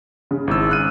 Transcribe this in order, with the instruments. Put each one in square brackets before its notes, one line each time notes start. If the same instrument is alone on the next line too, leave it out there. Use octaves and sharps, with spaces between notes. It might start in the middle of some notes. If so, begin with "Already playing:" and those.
[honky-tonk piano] C#3
[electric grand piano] G#1 E4 E6
F6 F#6 D#7